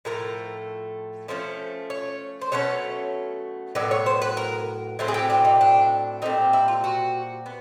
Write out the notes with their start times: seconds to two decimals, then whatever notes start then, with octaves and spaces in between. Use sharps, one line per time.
0.05 A2 F3 A3 A#4
1.28 F3 A3 C#4 C5
1.90 C#5
2.41 C5
2.52 B2 F#3 A3 C#4 C#5
3.75 A2 F#3 B3 D5
3.91 C#5
4.06 C5
4.22 B4
4.37 A#4
4.99 A2 F#3 A3 C4
5.08 G#4
5.14 G4
5.30 D4
5.45 D#4
5.61 D4
6.22 A#2 G3 C4 D#4
6.53 E4
6.68 F4
6.84 F#4
7.46 B3